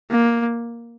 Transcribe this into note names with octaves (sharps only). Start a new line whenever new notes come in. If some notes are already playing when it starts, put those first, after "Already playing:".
A#3